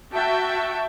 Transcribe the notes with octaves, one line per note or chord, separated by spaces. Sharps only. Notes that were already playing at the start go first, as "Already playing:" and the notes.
F#4 E5 G5 A5